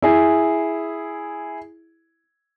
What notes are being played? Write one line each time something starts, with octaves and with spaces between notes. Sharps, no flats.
E4 G#4